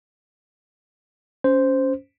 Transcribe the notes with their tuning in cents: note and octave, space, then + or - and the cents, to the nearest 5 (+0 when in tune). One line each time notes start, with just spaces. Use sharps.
C#4 +10 C5 -5